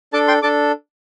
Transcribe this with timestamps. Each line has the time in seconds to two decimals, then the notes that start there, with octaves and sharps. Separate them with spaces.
0.13 D4 A4 A5 D6
0.27 G5 C6
0.42 D4 A4 A5 D6